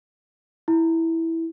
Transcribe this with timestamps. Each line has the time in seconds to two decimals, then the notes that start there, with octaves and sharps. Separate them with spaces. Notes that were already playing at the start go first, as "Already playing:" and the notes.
0.68 E4